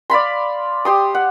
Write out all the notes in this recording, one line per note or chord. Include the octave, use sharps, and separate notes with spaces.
D5 F5 B5 C6
G4 C6 D#6
F#5